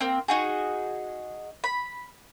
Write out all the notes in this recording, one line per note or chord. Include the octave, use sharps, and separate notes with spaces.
A#3 C4
D#4 F#4 G#4
B5